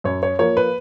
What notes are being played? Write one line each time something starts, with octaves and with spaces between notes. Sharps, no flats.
F#2 C#5
C#5
F3 A#3 C#5
B4